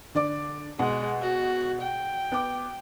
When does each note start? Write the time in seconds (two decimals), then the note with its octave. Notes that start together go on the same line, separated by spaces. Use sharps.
0.15 D3 D5 D6
0.79 B2 G#3 F#5
1.22 F#4
1.82 G5
2.32 B3 D6